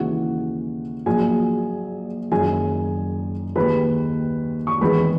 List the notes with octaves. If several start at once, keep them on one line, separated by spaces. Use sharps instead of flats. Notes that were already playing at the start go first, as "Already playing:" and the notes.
Already playing: D#2 C#3 E3 G#3 F#4 F#5
A#1 A#2 F#3 G#4 G#5
F#1 F#2 D#3 G#3 G#4 G#5
D#2 D#3 G#3 B4 B5
C#6
E1 E2 D#3 G#3 B4 B5